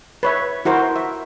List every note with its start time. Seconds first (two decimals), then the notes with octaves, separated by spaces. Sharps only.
0.23 B4 C#5 E5
0.65 E4 F#4 A#4 C5
0.96 E5